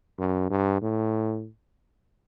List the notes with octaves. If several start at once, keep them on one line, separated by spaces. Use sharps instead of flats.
F#2
G2
A2